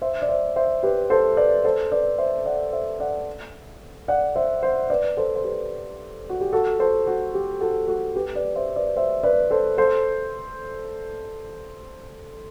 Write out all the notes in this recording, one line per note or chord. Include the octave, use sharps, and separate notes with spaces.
C5 E5
D5
C5 E5
C5 E5
G4 B4
A4 C5
B4 D5
A4 C5
B4 D5
C5 E5
D5 F#5
C5 E5
D5 F#5
D5 F#5
C5 E5
C5 E5
B4 D5
A4 C5
C5
G4 B4
F#4
G4
F#4 A4
A4 C5
F#4
G4
F#4 A4
F#4 A4
G4 B4
B4 D5
C5 E5
B4 D5
C5 E5
B4 D5
A4 C5
A4 C5